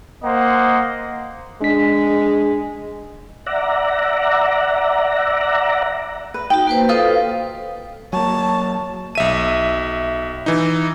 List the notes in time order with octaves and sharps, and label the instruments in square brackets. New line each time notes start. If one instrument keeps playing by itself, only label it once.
[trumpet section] A#3 C5 D#5 F#5
[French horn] G#3 [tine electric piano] D4 B6
[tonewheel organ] D5 E5 F#5 A#5
[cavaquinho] B4
[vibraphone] D#4 F#4 [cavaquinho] G5
[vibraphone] A#3 B4 C5
[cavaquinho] F4 D#5 F5 [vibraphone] A4 B4 C5
[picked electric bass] F#3 A#3 [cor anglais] C#5 [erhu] A5
[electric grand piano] B1 E5 D#7
E3 D#4